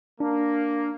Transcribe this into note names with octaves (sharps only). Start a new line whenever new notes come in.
A#3 D4